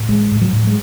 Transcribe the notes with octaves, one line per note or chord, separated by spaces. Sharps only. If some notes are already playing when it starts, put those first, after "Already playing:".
Already playing: A2
A1 G#3
A2
F#3
A2
G#3